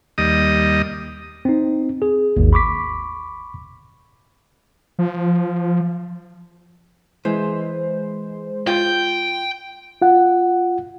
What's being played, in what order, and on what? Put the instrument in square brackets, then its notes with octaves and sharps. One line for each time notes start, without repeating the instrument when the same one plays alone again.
[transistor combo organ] D#2 G3 D#5 D#6
[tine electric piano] C4 D#4
G#4
G#1 D#2
B5 C#6 D6 B6
[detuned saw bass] F3
[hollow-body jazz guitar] E3 [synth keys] G#3 C5
[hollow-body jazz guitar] F4 [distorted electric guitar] G5
[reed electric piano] F4 F#5